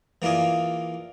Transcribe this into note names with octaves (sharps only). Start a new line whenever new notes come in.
E3 A#3 D4 F4 G#4